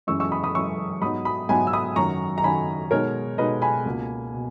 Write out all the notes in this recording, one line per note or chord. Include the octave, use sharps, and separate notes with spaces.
F#2 E3 G#3 C#4 C#6 E6
C#6 E6
B5 D#6
B5 D#6
F#2 E3 G#3 C#4 C#6 E6
G#2 F#3 B3 D#4 B5 D#6
B5 D#6
G#2 F#3 B3 D#4 G#5 B5
E6
B5 D#6
F#2 D#3 F#3 A#5 C#6
A#5
F#2 D#3 F#3 G#5 B5
B2 G#3 D#4 A#4 C#5
B2 G#3 D#4 B4 D#5
G#5 B5
C#2 B2 A#3
B2